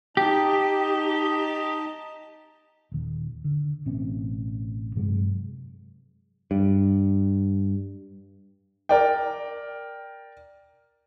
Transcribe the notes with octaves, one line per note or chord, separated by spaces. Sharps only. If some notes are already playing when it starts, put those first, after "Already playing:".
D#4 G4 D#5 A5
D#1 D#3
D3
A1 B2 C4 C#4
G2 C3 F#3 G#3
G2
A#4 D5 G5